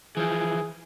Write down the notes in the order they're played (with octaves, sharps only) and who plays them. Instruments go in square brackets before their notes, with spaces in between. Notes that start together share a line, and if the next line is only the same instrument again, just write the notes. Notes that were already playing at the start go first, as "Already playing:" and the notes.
[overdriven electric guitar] E3 F3 [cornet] G#4